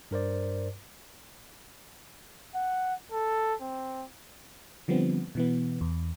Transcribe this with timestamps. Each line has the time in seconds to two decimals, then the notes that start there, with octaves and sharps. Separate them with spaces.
0.11 G2 A#4 C5 D5
2.55 F#5
3.12 A4
3.61 C4
4.88 D3 F3 G3 B3 C4
5.35 B2 E3 B3
5.81 E2